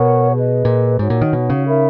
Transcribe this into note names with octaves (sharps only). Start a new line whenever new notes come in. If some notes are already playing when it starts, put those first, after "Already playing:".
Already playing: B2 A#4 C#5 F#5 C#6
G#4 B4 D#5
A#2
G#2 D#4 F#4 C#5 F#5
A#2
D#3
B2
C#3
D#4 A#4 E5 B5